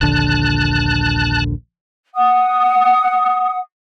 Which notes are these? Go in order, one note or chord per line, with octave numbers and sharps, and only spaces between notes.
D#1 A#1 D3 A5 F#6
F#5 D#6